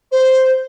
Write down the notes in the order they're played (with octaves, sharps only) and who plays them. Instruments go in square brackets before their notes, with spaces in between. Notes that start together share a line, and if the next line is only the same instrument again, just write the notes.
[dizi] C5